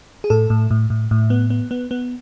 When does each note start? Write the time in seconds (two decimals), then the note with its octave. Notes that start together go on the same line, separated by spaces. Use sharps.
0.24 G#4
0.30 A2 A4
0.50 A2
0.71 A2
0.90 A2
1.11 A2
1.30 B3
1.50 B3
1.71 B3
1.91 B3